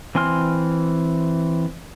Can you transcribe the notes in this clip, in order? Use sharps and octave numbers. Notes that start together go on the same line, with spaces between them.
E3 C4 G#5 C6 F6